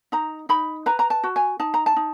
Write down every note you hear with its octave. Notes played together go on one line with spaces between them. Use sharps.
D#4 A#5
D#4 B5
B4 A#5
A#5
A5
F#4
G#5
D#4 A5
A#5
A5
D#4